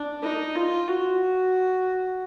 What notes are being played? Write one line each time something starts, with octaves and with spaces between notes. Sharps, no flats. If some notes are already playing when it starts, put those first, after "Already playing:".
Already playing: D4
D#4
F4
F#4